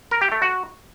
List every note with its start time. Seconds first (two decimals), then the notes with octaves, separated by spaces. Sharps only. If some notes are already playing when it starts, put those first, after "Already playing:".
0.11 A#4
0.22 G4
0.32 A3
0.42 F#4